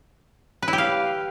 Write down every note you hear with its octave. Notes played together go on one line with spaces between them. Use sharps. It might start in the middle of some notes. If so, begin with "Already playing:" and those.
B4
E4
G4
F5